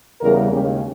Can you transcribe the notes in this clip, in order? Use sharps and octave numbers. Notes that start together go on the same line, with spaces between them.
E2 C#3 G3 A#4
D#2 C#3 G#3 C#4 G4